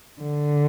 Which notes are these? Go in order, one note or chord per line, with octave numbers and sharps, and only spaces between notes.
D3